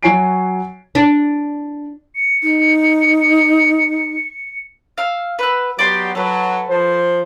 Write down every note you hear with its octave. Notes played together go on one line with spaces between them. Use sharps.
F#3 F#4 C#5 G#5 C7 D7
D4
C#7
D#4
F5 E6
B4 F#5 E6
F#3 B3 G4 D5 G5 C6
F#3 A4 B4
F3 C5